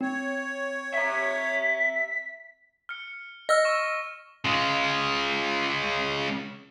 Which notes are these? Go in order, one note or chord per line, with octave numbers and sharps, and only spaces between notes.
C4 C#5
E5 A#5 B6
F6 C#7
D#5 E6 F6 A#6
C#6 E7
C#3 G#3